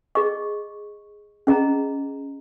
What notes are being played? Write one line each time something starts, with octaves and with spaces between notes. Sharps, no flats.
G#4 D#5 C#6
C#4 G#4 D#5 A#5